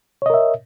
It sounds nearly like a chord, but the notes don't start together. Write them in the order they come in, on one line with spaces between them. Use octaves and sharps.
C#5 D#5 A#4 E5